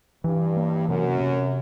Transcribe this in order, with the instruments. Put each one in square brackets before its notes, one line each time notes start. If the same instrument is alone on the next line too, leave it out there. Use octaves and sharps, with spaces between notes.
[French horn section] G2 [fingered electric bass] E3
[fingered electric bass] A#3
[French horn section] F#2 [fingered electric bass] C3
[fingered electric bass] C3